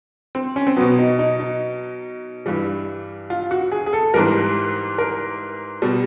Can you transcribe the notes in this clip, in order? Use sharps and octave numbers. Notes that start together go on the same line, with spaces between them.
C4
C#4
C4
B2 F#3 B3
D#4
D#4
D#4
G2 E3 G3
F4
F#4
G#4
G#4
A4
G#2 E3 G3 A#4
A#4
B2 G3